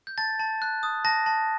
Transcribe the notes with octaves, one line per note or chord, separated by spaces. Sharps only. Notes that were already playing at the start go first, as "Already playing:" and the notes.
G6
A5 A6
A5
F#6
D#6
A5 A#6
A5